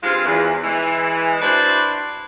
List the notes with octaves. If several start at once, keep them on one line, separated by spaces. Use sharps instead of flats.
G2 G#3 C4 F4
E2 E3
E3 G#3
D4 E4 F#4 B4 C5 D5